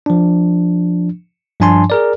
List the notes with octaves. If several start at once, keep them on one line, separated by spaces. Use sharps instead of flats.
F3 D4
G2 F3 D4 G#5 A5 C6
G#4 A#4 D5